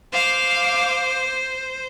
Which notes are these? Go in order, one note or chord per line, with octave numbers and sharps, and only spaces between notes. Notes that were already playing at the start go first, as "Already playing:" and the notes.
C5 F5 D6